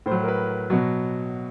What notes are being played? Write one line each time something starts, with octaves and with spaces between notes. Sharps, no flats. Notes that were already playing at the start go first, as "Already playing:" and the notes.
A2 C5
F#3
A#4
B4
B2 F#3 F#4